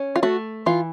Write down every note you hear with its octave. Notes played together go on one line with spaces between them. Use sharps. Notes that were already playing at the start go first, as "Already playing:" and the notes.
Already playing: C#4
F4
A3 F#4
E3 F4